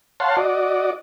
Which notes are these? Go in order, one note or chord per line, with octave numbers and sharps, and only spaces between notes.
C#5 F5 F#5 A5 C6
F#4 D5 D#5